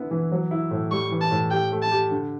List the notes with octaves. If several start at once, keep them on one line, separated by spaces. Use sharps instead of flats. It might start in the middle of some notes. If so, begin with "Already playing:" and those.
Already playing: D3 B3 E4
E3
F#3
E4
A2
G3 C#6
E3
A5
A2
G4 G5
A3
A5
G4
D3